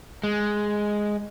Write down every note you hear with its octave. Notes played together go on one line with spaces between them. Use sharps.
G#3